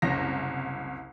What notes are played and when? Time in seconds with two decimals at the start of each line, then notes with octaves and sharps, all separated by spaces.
0.02 F#1 C2 A#6